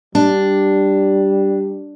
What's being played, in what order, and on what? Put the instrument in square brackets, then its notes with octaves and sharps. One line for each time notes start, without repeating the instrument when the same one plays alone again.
[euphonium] G3 [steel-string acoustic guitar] D4